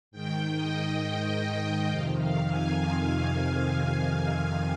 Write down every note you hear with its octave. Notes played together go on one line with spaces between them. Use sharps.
G#2 D#3 G5
D#5
F2 C3 D#3 F5
F5
G#5